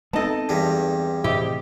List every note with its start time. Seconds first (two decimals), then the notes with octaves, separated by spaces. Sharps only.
0.13 G#3 B3 C4 D#4 A4 D#5 A5
0.49 E2 G2 G3
1.24 A2 C3 F3 E4 G4 C5 D#5